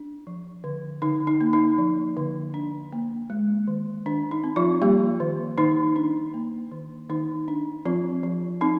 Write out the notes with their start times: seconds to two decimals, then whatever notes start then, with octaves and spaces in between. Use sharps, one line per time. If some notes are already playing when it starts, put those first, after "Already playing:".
Already playing: D4
0.27 F3
0.64 D3
1.02 D3 D#4
1.27 D#4
1.41 A#3
1.53 D#4
1.78 F3
2.17 D3
2.54 D4
2.93 A#3
3.30 G#3
3.67 D#3
4.06 D#3 D4
4.31 D#4
4.44 C4
4.56 F3 F4
4.82 G3 A#3 G4
5.20 D#3
5.58 D#3 D#4
5.96 D4
6.34 A#3
6.72 D#3
7.10 D#3 D#4
7.48 D4
7.85 F3 C4 F4
8.23 F3
8.61 C4 D#4